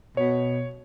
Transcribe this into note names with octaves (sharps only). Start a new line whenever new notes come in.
B2 C#5